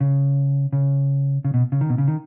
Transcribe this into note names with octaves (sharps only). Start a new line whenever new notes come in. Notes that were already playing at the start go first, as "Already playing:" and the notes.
C#3
C#3
C#3
B2
C#3
D#3
B2
C#3
D#3